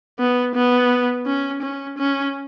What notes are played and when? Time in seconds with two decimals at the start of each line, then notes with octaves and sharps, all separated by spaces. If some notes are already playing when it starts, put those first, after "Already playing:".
0.20 B3
0.55 B3
1.26 C#4
1.62 C#4
1.98 C#4